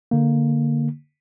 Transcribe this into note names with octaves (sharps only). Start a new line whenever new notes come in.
D3 A#3